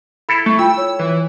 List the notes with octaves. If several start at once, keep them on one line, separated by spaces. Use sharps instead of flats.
E4 A4 F5 B5
A3 C#6
F4 G5 E6
C#5
E3